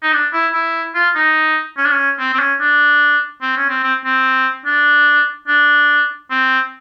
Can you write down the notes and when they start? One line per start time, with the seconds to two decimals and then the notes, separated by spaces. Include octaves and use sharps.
0.03 D#4
0.13 D4
0.33 E4
0.53 E4
0.95 F4
1.16 D#4
1.77 C#4
1.85 D4
1.92 C#4
2.19 C4
2.33 C4
2.39 C#4
2.61 D4
3.42 C4
3.57 C#4
3.69 C4
3.83 C4
4.05 C4
4.66 D4
5.48 D4
6.31 C4